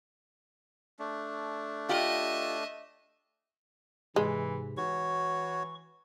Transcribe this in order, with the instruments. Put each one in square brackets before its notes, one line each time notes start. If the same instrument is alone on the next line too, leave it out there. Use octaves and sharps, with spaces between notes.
[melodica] A3 D4
[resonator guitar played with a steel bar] F4 G4 [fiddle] D#5 E5
[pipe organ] G#2 C3 [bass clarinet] E3 [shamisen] G#3
[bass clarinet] E3 [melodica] F#4 C#5 [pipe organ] C#6